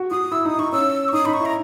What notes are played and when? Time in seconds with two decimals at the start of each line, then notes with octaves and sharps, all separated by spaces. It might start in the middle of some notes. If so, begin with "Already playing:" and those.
Already playing: F#4
0.11 F#4 D#6
0.31 E4 E6
0.45 D#4 D#6
0.58 D#4 C#6
0.72 C#4 E6
1.08 C#6
1.13 D#4 D#6
1.25 D#4 B5
1.33 C#6
1.40 E4
1.45 A#5